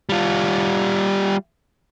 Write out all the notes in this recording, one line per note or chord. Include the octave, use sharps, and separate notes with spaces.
G3 F4